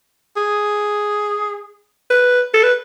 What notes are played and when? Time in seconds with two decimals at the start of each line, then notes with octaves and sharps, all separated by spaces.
0.36 G#4
2.10 B4
2.54 A4
2.63 B4